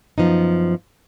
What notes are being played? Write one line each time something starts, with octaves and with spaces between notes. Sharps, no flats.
F#2 F3 B3 D#4